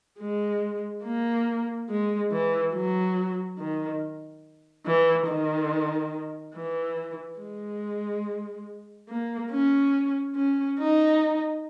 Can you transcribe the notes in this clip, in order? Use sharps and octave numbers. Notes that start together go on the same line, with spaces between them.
G#3
A#3
G#3
E3
F#3
D#3
E3
D#3
E3
G#3
A#3
C#4
C#4
D#4